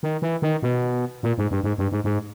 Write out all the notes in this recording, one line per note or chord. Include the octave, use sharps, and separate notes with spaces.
D#3
E3
D#3
B2
A#2
G#2
G2
G#2
G2
G#2
G#2